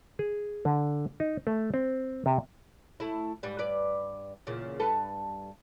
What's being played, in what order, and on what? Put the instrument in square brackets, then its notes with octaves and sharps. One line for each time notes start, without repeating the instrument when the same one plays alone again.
[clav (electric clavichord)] G#4
D3
D#4
A3
C4
C3
[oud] A3 E4
G#2 G3 B4
G2 B4 D5
E2 A#2 C#3
G2 A4 B4